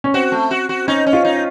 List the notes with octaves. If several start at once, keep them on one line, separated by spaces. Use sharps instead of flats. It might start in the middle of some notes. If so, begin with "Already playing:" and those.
C#4
C4 F#4
A3
F#4
F#4
C#4 D#4
C#4
F4
D#4